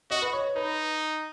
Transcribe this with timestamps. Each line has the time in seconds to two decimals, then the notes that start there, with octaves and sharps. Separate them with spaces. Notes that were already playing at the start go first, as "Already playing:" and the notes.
0.11 F#4 D#5
0.22 B4
0.33 C#5
0.56 D#4 B4